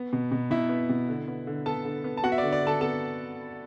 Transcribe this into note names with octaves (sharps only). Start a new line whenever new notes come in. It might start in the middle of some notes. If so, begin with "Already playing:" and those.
Already playing: B3
B2
B2
B2 E4 E5
B3
B2
D3
B3
D3
B3 A4 A5
D3
B3
A5
B3 F#4 F#5
E5
D3 D5
D5
D3 A4 A5
B3 A4 A5